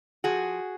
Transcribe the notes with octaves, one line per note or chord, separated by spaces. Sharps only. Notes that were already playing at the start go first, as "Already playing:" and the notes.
F3 F#4 G#4